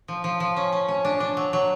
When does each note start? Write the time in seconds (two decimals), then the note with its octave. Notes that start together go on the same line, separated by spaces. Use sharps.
0.08 F3
0.24 F3
0.40 F3
0.57 C#4
0.72 C#4
0.88 C#4
1.05 D4
1.20 D4
1.37 F#3
1.53 F#3